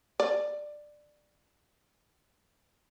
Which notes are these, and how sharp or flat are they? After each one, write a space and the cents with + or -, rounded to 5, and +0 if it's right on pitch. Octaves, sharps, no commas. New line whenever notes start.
D5 +15